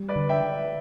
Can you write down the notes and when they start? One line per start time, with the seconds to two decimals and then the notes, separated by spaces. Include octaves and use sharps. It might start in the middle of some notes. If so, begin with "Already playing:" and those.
Already playing: G3
0.08 B4 D5
0.16 D3
0.29 E5 G5